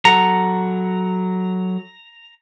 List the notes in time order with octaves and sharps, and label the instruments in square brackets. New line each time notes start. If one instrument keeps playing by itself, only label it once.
[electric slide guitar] F#3 A4 F#5 [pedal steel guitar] A#5